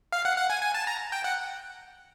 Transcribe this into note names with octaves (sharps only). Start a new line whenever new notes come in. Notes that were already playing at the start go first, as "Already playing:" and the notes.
F5
F#5
F#5
G#5
G#5
A5
A#5
G5
F#5